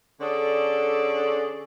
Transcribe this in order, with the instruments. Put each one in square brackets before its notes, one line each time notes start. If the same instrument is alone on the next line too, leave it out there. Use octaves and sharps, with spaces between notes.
[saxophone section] D3 C#4 G#4 A4 D5